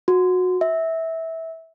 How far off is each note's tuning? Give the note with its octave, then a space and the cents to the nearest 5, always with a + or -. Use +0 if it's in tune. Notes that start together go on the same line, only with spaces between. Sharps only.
F#4 -20
E5 -20